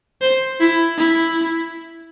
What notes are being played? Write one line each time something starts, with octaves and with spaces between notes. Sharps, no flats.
C5
E4
E4